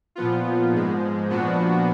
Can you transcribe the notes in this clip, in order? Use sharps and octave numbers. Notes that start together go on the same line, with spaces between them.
A#2 F3 B3 F4
G#2 F3 G#3
A#2 F3 B3 D4 F#4